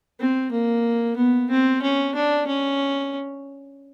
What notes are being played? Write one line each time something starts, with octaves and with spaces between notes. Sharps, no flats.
C4
A#3
B3
C4
C#4
D4
C#4